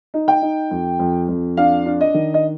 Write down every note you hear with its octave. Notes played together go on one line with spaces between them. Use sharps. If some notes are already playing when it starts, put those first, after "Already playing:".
D#4
G5
D#4
F2
F2
F2
D4 F5
D4
D#5
D#3
D#5